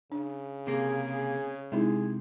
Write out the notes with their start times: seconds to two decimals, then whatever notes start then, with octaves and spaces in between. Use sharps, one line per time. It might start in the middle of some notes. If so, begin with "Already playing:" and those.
0.12 C#3 D4
0.67 C3 A#3 G#4
1.72 C3 G#3 D#4 E4 G#4